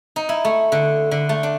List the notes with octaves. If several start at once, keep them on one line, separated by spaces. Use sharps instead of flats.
D#4
E4
A3
D3
D3
A3
D4